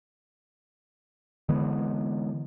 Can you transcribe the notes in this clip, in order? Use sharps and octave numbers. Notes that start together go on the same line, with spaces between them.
D3 E3 G#3 B3